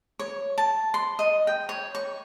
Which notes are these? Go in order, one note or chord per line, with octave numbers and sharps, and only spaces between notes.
C#5
A5
C6
D#5
G5
C#5
C#6